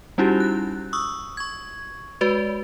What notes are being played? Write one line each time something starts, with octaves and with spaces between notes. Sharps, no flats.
G3 C#4 D#4 E4 F#4 G4
F#6
C#6 D#6 E6
C#6 G#6
G#3 F#4 B4 D5